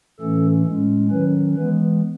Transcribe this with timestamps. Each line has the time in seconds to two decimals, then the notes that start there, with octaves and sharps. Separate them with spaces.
0.20 A2 E3 A3 C#4 A4
0.66 A2 G#3 C#4
1.10 D#3 F#3 C#4 B4
1.56 E3 G#3 B3 B4